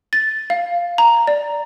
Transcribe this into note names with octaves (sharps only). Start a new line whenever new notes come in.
A6
F5
A#5
D5